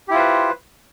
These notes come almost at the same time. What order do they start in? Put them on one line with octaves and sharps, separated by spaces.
G4 E4 F4 C5 B4